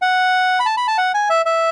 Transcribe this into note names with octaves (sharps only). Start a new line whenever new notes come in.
F#5
B5
A5
B5
A5
F#5
G#5
E5
E5